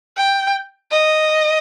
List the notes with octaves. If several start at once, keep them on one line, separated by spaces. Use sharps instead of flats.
G5
D#5